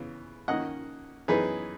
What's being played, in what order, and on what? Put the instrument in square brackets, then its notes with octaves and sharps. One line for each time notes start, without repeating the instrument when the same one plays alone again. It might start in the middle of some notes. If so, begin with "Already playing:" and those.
Already playing: [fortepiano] C#3 E3 B3
D#3 A#3 C#4 D#5 F#5
F#2 E3 B3 D#4 G#4 B4